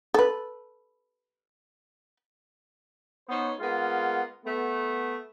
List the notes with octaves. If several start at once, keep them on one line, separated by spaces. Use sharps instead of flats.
A4 B4
B3 C#4 D#4 C5 C#5
G#3 A#3 B3 F4 F#5
A3 B3